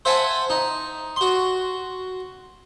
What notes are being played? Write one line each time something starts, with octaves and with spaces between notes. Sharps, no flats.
C5 E5 F#5 G#5 A5
D#4
F#4 C6